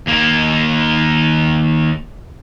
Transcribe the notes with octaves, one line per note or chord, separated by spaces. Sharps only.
D#2 A#3